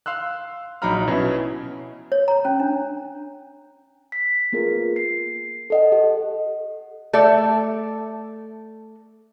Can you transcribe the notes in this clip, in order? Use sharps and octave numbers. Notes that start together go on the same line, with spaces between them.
F5 C6 E6 F#6
A#1 F#3 D#4 A#5 B5 F6
B2 C#4 E4
C#5
A#5
C#4
D4
B6
A#3 B3 F4 G#4 A#4
C7
A4 D#5 F#5
G4 A4 F#5
A3 A4 D5 E5